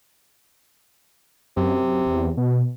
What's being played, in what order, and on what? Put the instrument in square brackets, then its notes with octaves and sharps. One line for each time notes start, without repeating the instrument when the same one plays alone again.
[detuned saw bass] F#2 [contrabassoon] C3
[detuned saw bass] E2
B2